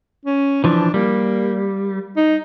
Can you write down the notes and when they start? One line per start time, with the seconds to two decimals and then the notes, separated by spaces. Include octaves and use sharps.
0.25 C#4
0.64 E3 F3 D4
0.94 G3 A#3
2.17 D#4